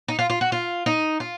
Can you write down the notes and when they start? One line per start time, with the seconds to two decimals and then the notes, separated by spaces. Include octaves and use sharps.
0.08 D#4
0.19 F4
0.30 F4
0.41 F#4
0.52 F4
0.86 D#4
1.20 F4